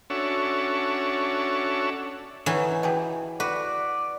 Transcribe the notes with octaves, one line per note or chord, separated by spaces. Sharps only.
C#4 D4 F#4 A4 C#5 E5
E3 B3 C#4 D#4
B2 G4 G#4
F#4 B4 D5